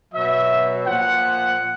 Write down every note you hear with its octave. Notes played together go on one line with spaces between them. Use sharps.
B2 F#3 E5
A#2 F3 F#5